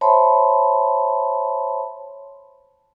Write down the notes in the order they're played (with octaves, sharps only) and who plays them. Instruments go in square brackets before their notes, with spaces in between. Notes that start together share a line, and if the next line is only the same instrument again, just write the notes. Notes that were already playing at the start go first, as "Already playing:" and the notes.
[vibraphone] C5 C#5 E5 A5 B5 C6